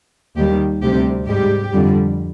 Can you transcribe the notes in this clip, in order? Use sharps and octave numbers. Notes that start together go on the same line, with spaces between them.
D#2 D#3 G3 G4
D2 C3 G3 G4
G#2 G3 G4
F2 D3 G3